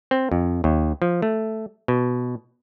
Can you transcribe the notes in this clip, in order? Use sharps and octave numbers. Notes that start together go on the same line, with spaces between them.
C4
F2
D#2
F3
A3
B2